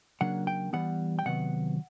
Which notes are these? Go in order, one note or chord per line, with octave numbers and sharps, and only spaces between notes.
C#3 F#3 A#3 D4 F#5
G5
E3 G3 B3 F#5
G5
C3 D#3 F#3 B3 F#5